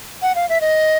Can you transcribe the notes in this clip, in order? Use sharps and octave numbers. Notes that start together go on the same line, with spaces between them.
F#5
F5
E5
D#5